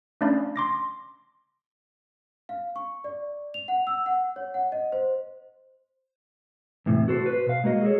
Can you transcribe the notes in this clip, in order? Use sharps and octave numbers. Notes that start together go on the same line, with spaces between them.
A3 C#4 D4 D5 F5 B5
C6 D6 A#6
F5
C#6
D5
F7
F#5
E6
F#5
C#5
F#5
D#5
C5
E2 A2 C3
F#4 A4 C5
B4 C5
B2 F5
G#3 A#3 F#4 D#5
G#4 A4 C#5